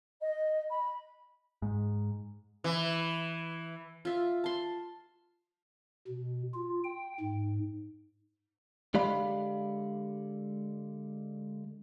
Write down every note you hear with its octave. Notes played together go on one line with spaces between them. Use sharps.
D#5
B5
G#2
E3
F4 E5
A5 C6
B2
F4
G5
G#2
D3 G#3 G4 D5 F5 B5